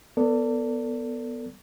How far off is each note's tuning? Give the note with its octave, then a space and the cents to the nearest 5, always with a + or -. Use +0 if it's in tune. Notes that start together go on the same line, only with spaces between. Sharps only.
B3 +0 A4 +35 D5 -15